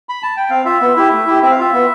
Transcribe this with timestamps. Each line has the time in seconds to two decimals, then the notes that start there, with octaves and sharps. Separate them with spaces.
0.09 B5
0.23 A5
0.37 G5
0.50 C4 F5
0.65 F4 E5
0.81 B3
0.96 E4 G4
1.12 A3
1.27 E4 G4
1.42 C4 E5
1.51 F5
1.58 F4 E5
1.73 B3